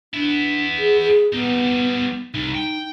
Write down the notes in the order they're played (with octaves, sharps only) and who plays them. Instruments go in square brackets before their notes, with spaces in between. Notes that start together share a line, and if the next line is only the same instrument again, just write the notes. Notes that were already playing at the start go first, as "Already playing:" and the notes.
[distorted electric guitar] B3 E4 [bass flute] D4
[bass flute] G#4
G#4
[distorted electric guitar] G3 D#4 [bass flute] B3
[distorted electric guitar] C2 [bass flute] D#4
[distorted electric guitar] G5